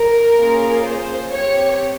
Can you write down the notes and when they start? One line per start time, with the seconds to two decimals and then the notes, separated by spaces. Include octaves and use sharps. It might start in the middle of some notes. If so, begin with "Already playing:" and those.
Already playing: A#4
0.36 A#3 C#4 F4 G#4
0.83 C5
1.30 C4 G4 C#5